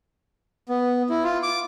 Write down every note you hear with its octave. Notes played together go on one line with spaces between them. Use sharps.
B3
E4
F4
D6